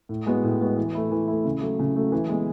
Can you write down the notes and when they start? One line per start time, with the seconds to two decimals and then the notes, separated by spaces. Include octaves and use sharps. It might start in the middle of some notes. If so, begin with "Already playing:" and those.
0.09 A2
0.26 G#3 B3 F#4
0.44 A2
0.61 G#3 B3 F#4
0.77 E3
0.95 A3 E4
1.11 E3
1.28 A3 E4
1.45 C#3
1.62 F#3 A3
1.79 C#3
1.96 F#3 A3
2.12 E3
2.29 G#3 B3